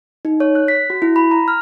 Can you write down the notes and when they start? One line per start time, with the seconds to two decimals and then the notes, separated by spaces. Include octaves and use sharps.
0.25 D#4
0.40 C#5
0.55 F#6
0.68 B6
0.90 F#4
1.02 E4
1.16 B5
1.31 A#5
1.48 F6